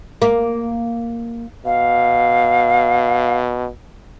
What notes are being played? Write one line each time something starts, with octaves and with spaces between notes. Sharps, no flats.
A#3
B2 F5